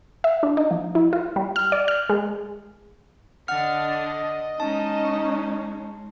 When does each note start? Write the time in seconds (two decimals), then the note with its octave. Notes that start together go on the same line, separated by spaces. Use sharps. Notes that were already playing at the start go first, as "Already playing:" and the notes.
0.24 E5
0.43 D4
0.57 D#4
0.71 F3
0.95 E4
1.13 F4
1.36 G3
1.56 F6
1.72 D5
1.88 F6
2.10 G#3
3.48 D3 D4 D#5 F#5 F6
4.60 G#3 C#4 D#4 A5